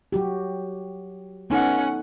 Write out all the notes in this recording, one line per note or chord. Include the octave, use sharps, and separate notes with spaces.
F#3 F#4 G4
B3 C#4 D#4 A4 F#5